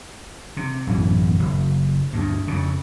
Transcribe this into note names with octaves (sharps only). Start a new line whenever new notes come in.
C3
A1 F#2 B2 E3
F#1
D2 G2
F2 C#3